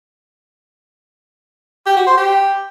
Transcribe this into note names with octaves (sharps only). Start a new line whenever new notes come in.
G4
F#4
C5
G4